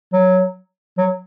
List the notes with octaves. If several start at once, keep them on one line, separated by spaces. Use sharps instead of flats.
F#3
F#3